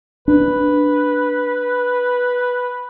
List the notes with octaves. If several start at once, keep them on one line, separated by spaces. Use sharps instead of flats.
D4 B4